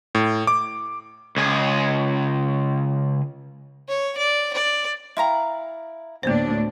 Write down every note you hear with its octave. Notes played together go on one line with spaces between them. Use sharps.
A2
D6
C#2 G#4
C#5
D5
D5
E4 F5 G5 A#5 C6
D2 A2 A#3 B3 D4 C5